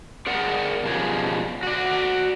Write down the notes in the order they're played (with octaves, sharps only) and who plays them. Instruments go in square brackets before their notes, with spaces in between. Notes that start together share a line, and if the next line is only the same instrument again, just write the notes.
[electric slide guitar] G#4 A#4 D5 F#5
B2 F3 G3 C#4 G#4
F#4 D5